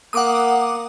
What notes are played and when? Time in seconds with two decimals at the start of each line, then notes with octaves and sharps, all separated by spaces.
0.13 A#3 F#5 D6 D#6